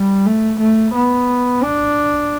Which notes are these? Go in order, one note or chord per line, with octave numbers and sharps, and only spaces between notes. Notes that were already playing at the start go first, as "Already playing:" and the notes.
Already playing: G3
A3
A3
B3
D4